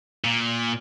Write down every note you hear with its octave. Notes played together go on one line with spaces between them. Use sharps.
A#2